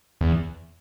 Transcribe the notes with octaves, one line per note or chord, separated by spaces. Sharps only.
E2